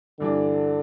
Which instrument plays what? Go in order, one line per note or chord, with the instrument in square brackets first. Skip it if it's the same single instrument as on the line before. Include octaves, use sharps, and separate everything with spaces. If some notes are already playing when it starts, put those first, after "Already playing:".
[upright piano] G2 E3 G3 D4 [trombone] D3